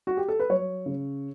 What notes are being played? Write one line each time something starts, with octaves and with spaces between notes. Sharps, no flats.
F#4
G4
A4
B4
F#3 C#5
C#3